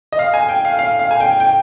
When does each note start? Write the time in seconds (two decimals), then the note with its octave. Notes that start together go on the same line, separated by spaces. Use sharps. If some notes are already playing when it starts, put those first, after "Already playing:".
0.12 D#5
0.19 F5
0.34 G#5
0.49 G5
0.65 F5
0.79 F5
0.99 F5
1.11 G#5
1.20 G5
1.40 G5